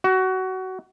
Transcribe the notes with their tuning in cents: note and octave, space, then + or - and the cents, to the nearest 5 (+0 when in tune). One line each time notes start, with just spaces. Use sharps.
F#4 +20